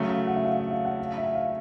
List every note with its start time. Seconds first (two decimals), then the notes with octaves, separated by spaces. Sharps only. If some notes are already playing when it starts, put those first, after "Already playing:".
Already playing: C#3 F#3 A3 E5
0.08 F5
0.27 F#5
0.36 E5
0.45 F5
0.58 E5
0.71 F5
0.85 F#5
0.99 F5
1.18 E5
1.35 F5